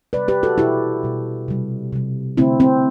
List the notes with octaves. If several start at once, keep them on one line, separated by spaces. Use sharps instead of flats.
C3 G3 B4 D5
G4 B4
F#4 A4
B2 G3 E4 G4
B2 G3
C3 G3
C3 G3
D3 A3 C4 E4
C4